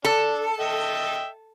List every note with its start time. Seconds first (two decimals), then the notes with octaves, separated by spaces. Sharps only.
0.05 D4 A4
0.60 D#5 E5 G5